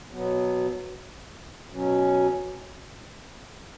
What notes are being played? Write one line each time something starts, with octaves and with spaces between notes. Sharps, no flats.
B2 F#3 B3
B2 F#3 C#4